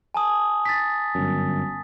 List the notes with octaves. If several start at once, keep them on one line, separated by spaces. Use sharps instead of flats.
G#5 A5 D#6
A6 B6
G1 F#2